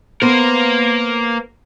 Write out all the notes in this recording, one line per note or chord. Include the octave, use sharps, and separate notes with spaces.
A#3 B3 A#4 C5